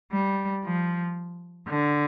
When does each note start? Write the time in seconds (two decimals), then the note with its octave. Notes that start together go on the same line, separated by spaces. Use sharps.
0.12 G3
0.64 F3
1.68 D3